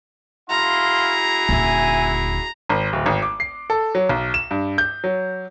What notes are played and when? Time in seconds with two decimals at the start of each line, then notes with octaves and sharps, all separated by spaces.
0.49 E4 F#4 G#4 F5 A#5 C6
1.49 D#1 D3 E5 G#5
2.69 G#1
2.93 D1
3.06 G#1
3.22 D6
3.40 C7
3.70 A4
3.95 F#3
4.09 B1
4.34 E7
4.51 G2
4.78 G6
5.04 F#3